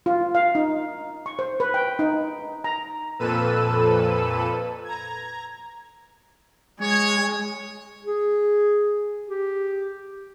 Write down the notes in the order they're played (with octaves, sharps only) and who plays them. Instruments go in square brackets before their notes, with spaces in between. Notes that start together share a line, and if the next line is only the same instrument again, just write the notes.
[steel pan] F4
F5
D#4
C#6
C5
B4
G5
D#4
A#5
[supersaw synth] F2 A#2 A4 B4 E6 D#7
A#5 G#6
[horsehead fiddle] G#3 [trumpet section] C#5
[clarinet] G#4
G4